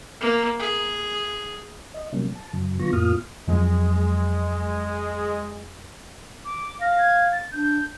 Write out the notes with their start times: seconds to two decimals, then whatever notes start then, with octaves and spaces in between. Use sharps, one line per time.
0.21 A#3
0.59 G#4
1.94 D#5
2.13 C3 F#3 G3 A#3 C#4
2.36 A5
2.53 F#2 C#3 F#3
2.79 D3 F#3 B3 F4 C#6 A#6
2.93 F2 A2 A#3 F4 D#6 F6
3.48 F2 F3 F#3 G#3
6.45 D6
6.81 F5 A#6
6.98 G#6
7.32 A6
7.52 D4 G6